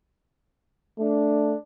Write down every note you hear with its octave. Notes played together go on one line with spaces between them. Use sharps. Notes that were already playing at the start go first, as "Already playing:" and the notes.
A3 D4